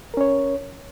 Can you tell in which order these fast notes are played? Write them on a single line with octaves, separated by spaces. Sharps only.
A#4 C#4 C#5